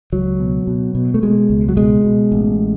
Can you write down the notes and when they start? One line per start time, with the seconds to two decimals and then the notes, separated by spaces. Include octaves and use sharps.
0.12 C#2 F#3
0.39 B2
0.67 B2
0.95 B2
1.14 A3
1.22 B2 G#3
1.49 C#2
1.69 F#3
1.77 B2 G#3
2.05 B2
2.32 A1